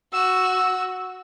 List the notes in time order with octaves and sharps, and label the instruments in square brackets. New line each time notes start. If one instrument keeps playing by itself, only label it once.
[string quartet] F#4 [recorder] E6